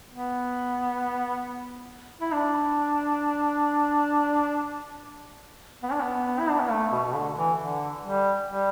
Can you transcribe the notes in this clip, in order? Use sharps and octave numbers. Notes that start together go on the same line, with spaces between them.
B3
E4
D4
B3
D4
B3
E4
D4
B3
A3
B2
B2
D3
E3
D3
G3
G3